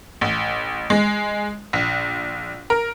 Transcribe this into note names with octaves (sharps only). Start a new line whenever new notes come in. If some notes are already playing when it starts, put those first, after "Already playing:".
A1
G#3
A#1
A#4